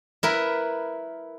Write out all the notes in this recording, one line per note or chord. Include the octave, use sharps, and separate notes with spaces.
E4 A#4 B4